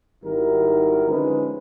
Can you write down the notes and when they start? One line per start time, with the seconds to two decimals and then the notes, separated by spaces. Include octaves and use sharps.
0.24 G#1 D#3 G3 E4 F#4 A#4
1.08 D3 F3 G#3 C#4 D#4 B4